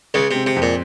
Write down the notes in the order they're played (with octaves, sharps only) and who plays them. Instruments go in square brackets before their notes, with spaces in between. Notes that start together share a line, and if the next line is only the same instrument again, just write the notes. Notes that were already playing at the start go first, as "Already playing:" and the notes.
[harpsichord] C#2 C#3 [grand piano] G#3
[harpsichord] C3 [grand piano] C4
[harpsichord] C3
[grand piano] F2
[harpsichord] A#2